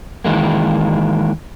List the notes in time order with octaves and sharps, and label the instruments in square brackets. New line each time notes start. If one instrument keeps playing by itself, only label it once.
[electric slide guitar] D#3 E3 G#3 A#3